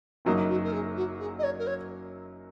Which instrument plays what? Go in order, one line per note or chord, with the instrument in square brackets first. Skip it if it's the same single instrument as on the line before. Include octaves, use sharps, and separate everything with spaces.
[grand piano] F#1 F#2 F#3 A#3 D#4 [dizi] A#4
[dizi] F#4
A#4
G#4
F#4
G#4
D#5
C#5
A#4
C#5